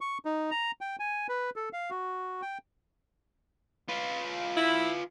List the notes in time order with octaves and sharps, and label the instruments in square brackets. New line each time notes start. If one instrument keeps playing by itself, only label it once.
[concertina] C#6
D#4
A#5
G5
G#5
B4
A4
F5
F#4
G5
[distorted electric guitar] F4 B4
[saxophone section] E4